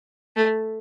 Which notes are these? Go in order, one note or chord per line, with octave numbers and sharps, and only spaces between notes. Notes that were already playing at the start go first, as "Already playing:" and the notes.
A3